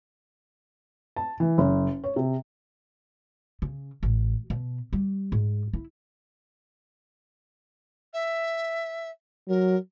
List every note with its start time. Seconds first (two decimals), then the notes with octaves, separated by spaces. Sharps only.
1.16 A5
1.40 E3
1.58 F#1
2.04 C#5
2.16 C3
3.62 C#3
4.03 A1
4.50 B2
4.93 G3
5.32 G#2
5.73 E4
8.13 E5
9.48 F#3 A#4